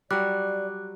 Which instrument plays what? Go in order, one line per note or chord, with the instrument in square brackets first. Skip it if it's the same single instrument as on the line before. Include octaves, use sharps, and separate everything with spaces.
[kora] F#3 G3 [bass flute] D5 [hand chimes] D6 F#6